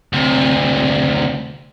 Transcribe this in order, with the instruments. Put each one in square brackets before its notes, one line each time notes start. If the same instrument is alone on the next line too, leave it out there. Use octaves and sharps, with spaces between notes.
[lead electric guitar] D2 C3